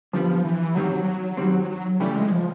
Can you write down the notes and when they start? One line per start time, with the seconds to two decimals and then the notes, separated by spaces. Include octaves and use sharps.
0.13 F#2 D3 F3 G3 B3
0.45 E3
0.75 G2 D#3 F#3 G3 C4
1.37 G2 D#3 G3 C4
2.00 C#3 E3 G3 A3 C#4
2.15 G#3
2.31 F3